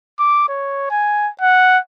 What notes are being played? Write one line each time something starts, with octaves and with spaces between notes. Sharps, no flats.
D6
C#5
G#5
F#5